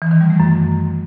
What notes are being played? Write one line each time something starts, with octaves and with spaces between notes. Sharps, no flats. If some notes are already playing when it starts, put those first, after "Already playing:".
E3
D#3
G3
A3
F#2